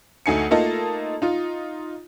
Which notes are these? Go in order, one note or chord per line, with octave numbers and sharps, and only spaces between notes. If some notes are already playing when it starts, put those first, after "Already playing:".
D2 A3 D#4 G#5 C7 C#7
A3 A#3 D#4 F4 A4 D#5
D#4 F4